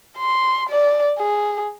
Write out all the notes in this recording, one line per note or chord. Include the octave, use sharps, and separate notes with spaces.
C6
D5
G#4